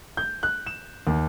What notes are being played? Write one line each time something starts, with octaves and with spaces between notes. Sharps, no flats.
G6
F#6
E7
D#2